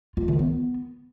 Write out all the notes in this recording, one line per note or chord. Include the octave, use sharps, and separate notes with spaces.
F4
D#3
B3